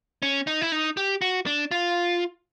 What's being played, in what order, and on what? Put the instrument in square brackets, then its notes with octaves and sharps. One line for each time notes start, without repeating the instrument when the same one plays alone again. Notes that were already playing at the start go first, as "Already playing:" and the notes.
[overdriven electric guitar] C#4
D#4
E4
D#4
G4
F#4
D4
F4